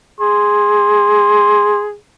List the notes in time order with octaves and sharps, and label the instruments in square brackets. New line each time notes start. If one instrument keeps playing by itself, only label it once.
[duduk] G#4 [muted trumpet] C6